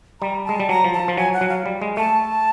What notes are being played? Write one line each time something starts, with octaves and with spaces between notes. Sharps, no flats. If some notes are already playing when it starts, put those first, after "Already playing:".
G3 A#5
G#3 A5
G3
F#3 A#5
F3
A5
F3
F#3 G#5
F#5
F#3
F5
G3
G#3
A3 A5